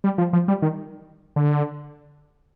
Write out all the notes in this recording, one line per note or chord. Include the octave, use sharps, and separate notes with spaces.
G3
F3
F3
G3
D#3
D3